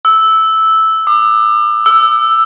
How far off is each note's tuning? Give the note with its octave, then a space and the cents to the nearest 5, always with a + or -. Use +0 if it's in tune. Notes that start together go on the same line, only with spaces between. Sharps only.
E6 -10
D6 +40
E6 +5